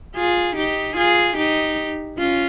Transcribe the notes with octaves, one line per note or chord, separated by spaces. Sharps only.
F4 G#4
D#4 G4
F4 G#4
D#4 G4
C#4 F4